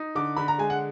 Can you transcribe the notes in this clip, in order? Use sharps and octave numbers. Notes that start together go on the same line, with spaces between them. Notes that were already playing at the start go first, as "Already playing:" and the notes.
Already playing: D#4
D3 D6
D3 B5
A#5
G#3 G#5
F#5